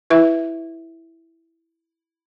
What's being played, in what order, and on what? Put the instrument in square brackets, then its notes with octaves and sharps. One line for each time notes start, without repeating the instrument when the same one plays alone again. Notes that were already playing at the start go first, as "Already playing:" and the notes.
[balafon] E4 B4 E5